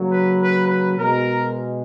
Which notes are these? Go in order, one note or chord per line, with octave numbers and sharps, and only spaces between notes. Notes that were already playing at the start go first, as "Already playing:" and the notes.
Already playing: C#3 F#3 A#3
B4
B4
B4
B2 G#3 A#4